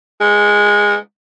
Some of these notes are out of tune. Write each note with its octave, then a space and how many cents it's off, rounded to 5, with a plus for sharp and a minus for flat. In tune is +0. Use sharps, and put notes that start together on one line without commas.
G#3 -10